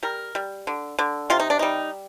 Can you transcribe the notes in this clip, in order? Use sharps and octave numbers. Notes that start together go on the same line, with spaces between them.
G3 A#4
G3
D3
D3
C3 F4
D#4
D4
G3 D#4